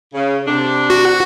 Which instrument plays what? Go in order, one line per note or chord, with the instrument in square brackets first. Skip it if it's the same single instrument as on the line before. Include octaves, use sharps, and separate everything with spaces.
[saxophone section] C#3
C3 D4
[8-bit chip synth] F#4